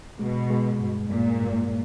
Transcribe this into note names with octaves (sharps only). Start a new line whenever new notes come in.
B2 G#3
G#3
G2
G2 A#2
G2